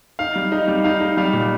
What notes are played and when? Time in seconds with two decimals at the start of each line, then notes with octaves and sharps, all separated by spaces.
0.19 D#4 F5
0.36 G3
0.52 D#4
0.68 G3
0.84 D#4 F5
1.00 D#4
1.17 G3 F5
1.33 A#2